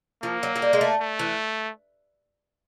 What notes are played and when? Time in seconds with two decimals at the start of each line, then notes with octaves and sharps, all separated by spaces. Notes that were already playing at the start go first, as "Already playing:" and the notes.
0.23 F3 A#3
0.43 F#3
0.56 F#3
0.62 G3
0.73 G#3
0.81 A3
1.01 A3
1.19 E3